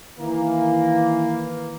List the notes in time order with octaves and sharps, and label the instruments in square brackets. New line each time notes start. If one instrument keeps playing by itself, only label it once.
[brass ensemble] D#3 E3 A#3